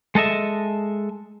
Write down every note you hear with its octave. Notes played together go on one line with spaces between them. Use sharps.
G#3 A4 D#5 E5